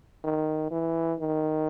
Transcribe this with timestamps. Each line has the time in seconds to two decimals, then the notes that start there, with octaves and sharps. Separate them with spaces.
0.24 D#3
0.71 E3
1.20 D#3